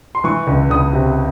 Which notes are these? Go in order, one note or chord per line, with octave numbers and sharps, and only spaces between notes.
C6
E3 C#6
C#2
C#2 D#6
C3